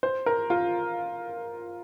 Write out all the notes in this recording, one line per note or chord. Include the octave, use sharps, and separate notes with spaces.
C5
A#4
F4